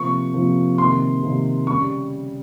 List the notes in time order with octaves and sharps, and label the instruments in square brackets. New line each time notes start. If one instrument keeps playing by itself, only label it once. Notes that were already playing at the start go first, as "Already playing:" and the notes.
Already playing: [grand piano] C3 F3 A#3 F4 [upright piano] C#6
[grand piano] C3 F3 A#3 F4
[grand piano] C3 D#3 A#3 [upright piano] C6
[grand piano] C3 D#3 A#3
[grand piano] C#3 G3 [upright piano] C#6